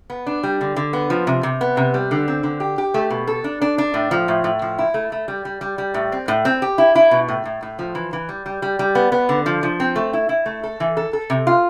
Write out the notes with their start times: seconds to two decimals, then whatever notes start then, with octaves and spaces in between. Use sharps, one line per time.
0.10 B3
0.27 D4
0.43 G3
0.61 D3
0.76 D3
0.93 B3
1.10 F3
1.27 C3
1.43 C3
1.61 B3
1.77 C3
1.94 G3
2.11 D3
2.28 C4
2.43 D3
2.60 G4
2.78 G4
2.94 A3
3.10 B2
3.27 A4
3.44 D4
3.62 D4
3.78 D4
3.94 A2
4.11 F3
4.28 A2
4.44 A2
4.62 F3
4.78 E4
4.94 A3
5.12 A3
5.28 G3
5.45 G3
5.61 G3
5.78 G3
5.94 A2
6.12 C4
6.28 A2
6.45 C4
6.62 G4
6.78 E4
6.95 E4
7.11 B2
7.29 A2
7.45 A2
7.63 A2
7.79 F3
7.95 E3
8.13 E3
8.29 G3
8.46 G3
8.62 G3
8.79 G3
8.95 B3
9.12 B3
9.29 D3
9.46 F3
9.63 F3
9.80 C4
9.96 A3
10.13 E4
10.29 E4
10.46 A3
10.63 A4
10.80 E3
10.97 A4
11.13 A4
11.30 C3
11.47 F4